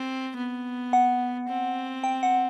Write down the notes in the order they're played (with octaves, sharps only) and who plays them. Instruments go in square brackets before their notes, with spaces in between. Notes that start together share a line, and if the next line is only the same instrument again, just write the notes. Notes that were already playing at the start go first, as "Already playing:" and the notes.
Already playing: [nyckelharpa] C4
B3
[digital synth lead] F#5
[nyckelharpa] C4
[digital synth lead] G5
F#5